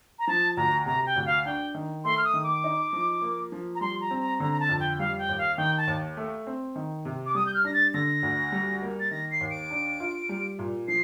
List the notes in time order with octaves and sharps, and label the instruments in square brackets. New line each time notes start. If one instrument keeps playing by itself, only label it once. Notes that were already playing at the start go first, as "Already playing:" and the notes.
[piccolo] A#5
[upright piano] F3 [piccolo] A5
[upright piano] D2 [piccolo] A#5
[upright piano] C3 [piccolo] A#5
[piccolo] G5
[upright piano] D2
[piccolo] F5
[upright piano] D4 [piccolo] G5
[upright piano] D#3
[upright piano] A3 [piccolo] C6
[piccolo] F6
D#6
[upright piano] D#3
[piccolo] D6
[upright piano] D#4
F3
A#3
F3
[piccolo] A#5
[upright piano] G3 [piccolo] C6
[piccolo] A#5
[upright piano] C4
[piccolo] A#5
[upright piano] D3 [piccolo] A#5
[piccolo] A#5
A5
[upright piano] F2
[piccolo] G5
[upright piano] G3 [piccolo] F5
[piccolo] G5
[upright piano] D#2
[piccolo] F5
[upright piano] D#3 [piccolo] G5
[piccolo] A5
[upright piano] D#2
A3
C4
D#3
C3
[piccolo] D6
[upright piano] G3 [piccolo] D#6
[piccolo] G6
F6
[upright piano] D4 [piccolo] A#6
[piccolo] A6
[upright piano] D3 [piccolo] A#6
[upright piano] D2
G3
A#3
[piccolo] A6
[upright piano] D#3 [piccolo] A#6
[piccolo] C7
[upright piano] D#2
[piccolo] D7
[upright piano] D4
F4
G3
A#2
[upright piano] F3 [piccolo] C7